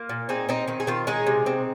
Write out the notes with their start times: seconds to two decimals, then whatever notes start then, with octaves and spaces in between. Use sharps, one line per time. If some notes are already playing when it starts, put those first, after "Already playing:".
Already playing: A#3 F4
0.09 A#2
0.29 C4 D#4 G#4
0.49 C4 D#4
0.68 D#3 D#4
0.80 G#4
0.87 D#3 C4 F4
1.07 G#3 D#4 G#4
1.27 C3
1.46 C4